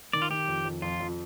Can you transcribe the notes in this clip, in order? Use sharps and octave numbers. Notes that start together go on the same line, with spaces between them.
D#3 D5
F4
D#3 G4
F2
F2
F2 F4
F2